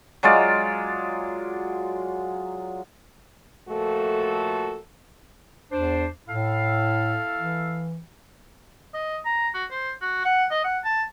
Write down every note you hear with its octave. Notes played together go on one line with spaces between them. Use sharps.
F#3 G#3 F4 D5
A#2 F3 A3 F#4 A4
E2 D4 C5
A2 E4 A4 F5
E3
D#5
A#5
F#4
C5
F#4
F#5
D#5
F#5
A5